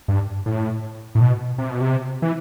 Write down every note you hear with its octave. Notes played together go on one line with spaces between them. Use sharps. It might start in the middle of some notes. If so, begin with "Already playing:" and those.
G2
A2
A2
B2
C3
B2
C3
E3